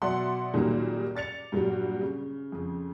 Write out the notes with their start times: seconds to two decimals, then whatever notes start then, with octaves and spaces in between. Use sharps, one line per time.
0.02 B2 F#3 D5 E5 F#5 C6
0.53 C#2 A#2 D#3 F#3 G3 A#3
1.15 D5 A6 C#7 F7
1.52 G2 A#2 F#3 G3 F#4
2.02 C#3
2.52 F2 C#3